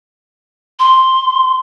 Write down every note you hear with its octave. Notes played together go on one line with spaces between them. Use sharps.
C6